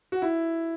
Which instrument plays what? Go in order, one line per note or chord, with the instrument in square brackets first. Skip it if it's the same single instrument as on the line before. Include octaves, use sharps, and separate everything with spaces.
[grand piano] F#4
E4